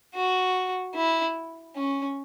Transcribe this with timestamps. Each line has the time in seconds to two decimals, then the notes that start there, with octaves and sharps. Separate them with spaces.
0.15 F#4
0.95 E4
1.76 C#4